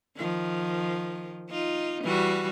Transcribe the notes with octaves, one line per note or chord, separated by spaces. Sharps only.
D#3 F3
D#4 F4
E3 G3 F#4